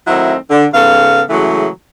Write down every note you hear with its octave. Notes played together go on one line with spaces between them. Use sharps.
D#3 F#3 A3 C4 D#4 E4
D3
G#2 C#3 B3 A4 C#5 F5
C#3 E3 F#3 G#3 A3